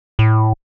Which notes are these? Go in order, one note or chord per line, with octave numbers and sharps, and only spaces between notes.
A2